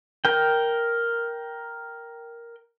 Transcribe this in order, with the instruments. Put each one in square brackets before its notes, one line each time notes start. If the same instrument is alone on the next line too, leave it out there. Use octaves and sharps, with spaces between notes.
[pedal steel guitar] A#4 G5